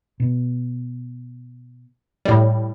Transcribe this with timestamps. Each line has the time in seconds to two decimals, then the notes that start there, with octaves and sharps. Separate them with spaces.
0.20 B2
2.25 A2 G3